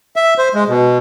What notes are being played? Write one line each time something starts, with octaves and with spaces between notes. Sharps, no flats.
E5
C5
G#3
B2